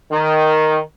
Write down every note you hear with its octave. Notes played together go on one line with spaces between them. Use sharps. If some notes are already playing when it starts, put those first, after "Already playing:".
D#3